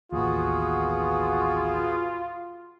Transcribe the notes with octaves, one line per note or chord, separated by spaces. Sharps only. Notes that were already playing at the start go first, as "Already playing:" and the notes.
A1 D#2 B3 F4 F#4 G#4